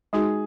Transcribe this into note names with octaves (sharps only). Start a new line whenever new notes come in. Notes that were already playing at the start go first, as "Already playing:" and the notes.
G#3 D#4 F#4 G#4